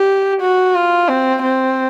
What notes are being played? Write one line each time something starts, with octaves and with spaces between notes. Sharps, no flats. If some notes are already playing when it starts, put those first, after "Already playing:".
Already playing: G4
F#4
F4
C4
C4